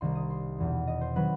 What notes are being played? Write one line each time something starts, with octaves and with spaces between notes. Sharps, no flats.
C2 C3 D#3 G3 C4 C6
D#6
C6
E1 E2 B2
D#5
C5
D#3 F#3 C4 B4